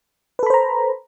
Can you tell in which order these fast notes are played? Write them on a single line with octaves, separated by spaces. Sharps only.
B4 A4 B5 C5 A#5